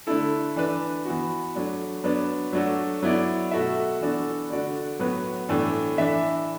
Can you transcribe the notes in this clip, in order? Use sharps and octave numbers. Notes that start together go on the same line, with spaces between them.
D3 A3 E4 A4
E3 D4 B4
E3 B3 F#4
F#3 A3 D4
F#3 B3 D4 B4
F#3 A3 D4 F#4 A4
F#3 B3 E4 D5
B2 A3 F#4 A4 E5
E3 B3 D4 F#4 A4
D3 A3 D4 F#4 D5
A2 F#3 B3 F#4 B4
A2 E3 B3 D4 A4
E3 D4 A4 E5